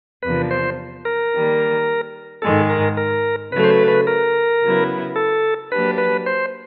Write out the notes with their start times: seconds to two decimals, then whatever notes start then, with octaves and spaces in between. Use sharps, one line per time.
0.23 E2 C3 F3 A#3 D4 B4
0.51 C5
1.05 A#4
1.32 D#3 G3 A#3
2.42 G#2 D#3 G#3 A4
2.70 A#4
2.97 A#4
3.52 C#3 F#3 A3 B4
3.64 C5
3.70 B4
3.88 B4
4.07 A#4
4.62 C#3 F#3 B3 E4
5.16 A4
5.71 F#3 A#3 D4 G4 B4
5.98 B4
6.26 C5